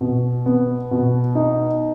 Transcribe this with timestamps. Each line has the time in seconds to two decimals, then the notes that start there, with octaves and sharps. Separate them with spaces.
0.01 B2
0.46 B3
0.91 B2
1.35 D#4